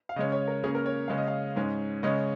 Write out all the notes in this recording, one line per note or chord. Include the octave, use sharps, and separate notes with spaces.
F5
C#3 G#3 C#4 D#5
C#5
A#4
C#3 A#3 C#4 G#4
A#4
C#5
C#3 G#3 C#4 F5
D#5
F5
G#2 G#3 C#4
C#3 G#3 C#4 D#5